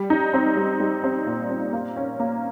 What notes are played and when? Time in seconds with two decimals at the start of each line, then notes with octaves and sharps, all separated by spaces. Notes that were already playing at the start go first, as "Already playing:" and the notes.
Already playing: G3
0.10 D#4
0.33 C4
0.57 G3
0.80 G3
1.04 C4
1.26 A#2
1.50 C4
1.73 A#3
1.96 C#4
2.20 A#3